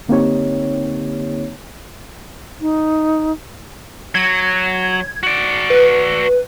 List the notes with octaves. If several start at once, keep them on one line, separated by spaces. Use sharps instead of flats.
D3 A#3 C4 D#4 G4 C#5
D#4
F#3 G#6
F#4 D5
B4